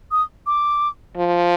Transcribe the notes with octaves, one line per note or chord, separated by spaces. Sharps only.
D#6
D6
F3